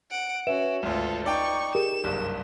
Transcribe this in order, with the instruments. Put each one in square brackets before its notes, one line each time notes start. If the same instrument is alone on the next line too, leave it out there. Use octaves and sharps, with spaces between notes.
[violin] F#5 D7
[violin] C#4 F#4 [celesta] B4 E5 E7
[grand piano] G#1 D2 [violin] F4 A4
[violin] D#4 C#6 [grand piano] D5 G5
[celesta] G4 G#4 A#4 [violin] E7
[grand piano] F#1 C2 G2